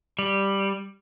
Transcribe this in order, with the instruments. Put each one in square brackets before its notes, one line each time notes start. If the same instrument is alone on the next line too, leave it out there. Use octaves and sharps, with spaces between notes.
[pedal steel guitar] G3